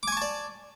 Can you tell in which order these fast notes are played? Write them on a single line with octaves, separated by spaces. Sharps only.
D6 G#5 C#6 A5 D5